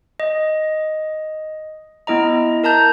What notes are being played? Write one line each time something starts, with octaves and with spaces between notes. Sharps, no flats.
D#5
B3 E4 D#5 A#5
A#4 A5 A#5 G6